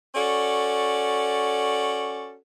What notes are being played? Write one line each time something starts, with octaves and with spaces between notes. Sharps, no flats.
C#4 F#4 A4 D5